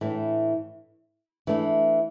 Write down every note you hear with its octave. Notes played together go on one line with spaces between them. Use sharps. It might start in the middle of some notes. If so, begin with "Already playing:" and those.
A2 E3 A3 D4
E3 A3 D4